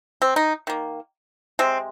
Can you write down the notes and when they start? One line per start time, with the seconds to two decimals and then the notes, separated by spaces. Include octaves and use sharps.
0.22 C4
0.36 D#4
0.67 D#3 A#3
1.59 C3 G#3 C4